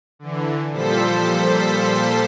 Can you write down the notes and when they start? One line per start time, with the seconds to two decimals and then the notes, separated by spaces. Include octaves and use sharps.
0.19 D3 E3
0.71 A#2 F3 G3 A4 C5 B6